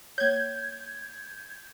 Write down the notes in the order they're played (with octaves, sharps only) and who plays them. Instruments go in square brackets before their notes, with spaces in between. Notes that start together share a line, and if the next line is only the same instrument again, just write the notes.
[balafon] A#3 C#5 [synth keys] G6 G#6